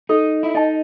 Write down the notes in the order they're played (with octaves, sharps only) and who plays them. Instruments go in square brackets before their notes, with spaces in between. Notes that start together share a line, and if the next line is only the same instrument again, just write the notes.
[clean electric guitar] D#4 [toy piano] A4
[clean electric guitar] E4
[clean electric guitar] D#4 [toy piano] D#5 A5